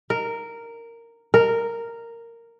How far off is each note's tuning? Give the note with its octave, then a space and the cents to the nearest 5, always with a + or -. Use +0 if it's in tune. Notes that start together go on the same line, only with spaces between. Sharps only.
A#4 -10
A#4 -10